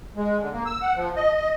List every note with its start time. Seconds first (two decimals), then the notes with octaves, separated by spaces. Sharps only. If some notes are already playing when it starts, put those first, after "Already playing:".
0.16 G#3
0.40 D3
0.53 A#3
0.66 E6
0.82 F#5
0.96 F3
1.16 D#5
1.36 D#5